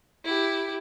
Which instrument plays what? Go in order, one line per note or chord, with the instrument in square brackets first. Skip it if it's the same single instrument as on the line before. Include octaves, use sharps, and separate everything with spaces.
[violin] E4 G4